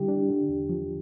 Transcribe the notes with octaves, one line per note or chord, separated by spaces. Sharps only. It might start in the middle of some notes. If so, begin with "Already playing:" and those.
Already playing: D3 G3 E4 G4
D4
D3
E2
F3